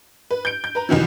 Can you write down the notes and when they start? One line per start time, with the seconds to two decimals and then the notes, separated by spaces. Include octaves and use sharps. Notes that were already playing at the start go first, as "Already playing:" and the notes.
0.31 B4
0.45 G6 D7
0.64 G6
0.75 B4 A#5
0.89 C2 D#3 E3 F#3